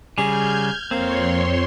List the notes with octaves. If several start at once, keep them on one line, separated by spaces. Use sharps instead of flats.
C#3 G3 G#4 F6 G6 G#6
F2 A#3 C4 C#5 C6